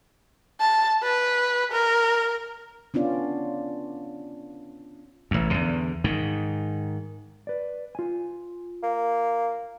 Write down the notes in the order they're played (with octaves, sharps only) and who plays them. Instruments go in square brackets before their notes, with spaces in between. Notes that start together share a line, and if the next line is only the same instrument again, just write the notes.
[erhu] A5
B4
A#4
[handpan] B3 C#4 D4 F4 D5
[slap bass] A1 E2
E2 D3
G#2 D#3
[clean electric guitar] B4 D5
F4 G#5
[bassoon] A#3